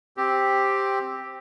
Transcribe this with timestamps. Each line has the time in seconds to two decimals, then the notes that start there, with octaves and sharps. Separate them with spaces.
0.17 C4 G4